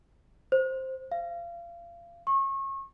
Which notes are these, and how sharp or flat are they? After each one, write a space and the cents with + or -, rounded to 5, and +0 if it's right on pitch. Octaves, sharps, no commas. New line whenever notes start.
C5 +5
F5 -30
C#6 -30